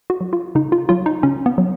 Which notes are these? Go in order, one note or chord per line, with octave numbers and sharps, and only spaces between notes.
F#4
F#3
F4
C#3 D#4
F4
F#3 F4
D#4
C#3 C#4
B3
F#3